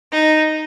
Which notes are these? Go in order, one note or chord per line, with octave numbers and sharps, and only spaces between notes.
D#4